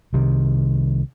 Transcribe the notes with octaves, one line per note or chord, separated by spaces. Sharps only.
C2 C3 D#3